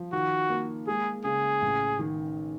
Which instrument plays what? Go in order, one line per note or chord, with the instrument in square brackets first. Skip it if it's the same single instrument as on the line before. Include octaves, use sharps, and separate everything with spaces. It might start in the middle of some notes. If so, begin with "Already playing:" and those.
Already playing: [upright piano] F3
[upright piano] D#3 [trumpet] F#4
[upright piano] A#3
[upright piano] G#3 [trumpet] G#4
[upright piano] C#3 [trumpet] G#4
[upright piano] A1
D#3